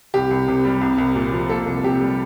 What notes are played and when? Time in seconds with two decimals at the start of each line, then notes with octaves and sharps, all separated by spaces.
0.14 C2 G4
0.31 C2
0.48 C3
0.65 G3
0.81 C2
0.98 C2
1.15 A#2
1.32 F3
1.49 A#3 A4
1.66 C2
1.84 C3 G4
2.01 G3